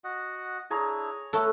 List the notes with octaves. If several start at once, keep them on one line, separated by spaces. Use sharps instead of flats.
F#4 D#5 F#5
D4 E4 G#4 C#5 A#5
A3 C#4 A4 B4